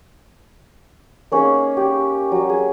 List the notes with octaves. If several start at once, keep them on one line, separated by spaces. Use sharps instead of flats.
A#3 C#4 D#4 G#4
G4
F#3
G#4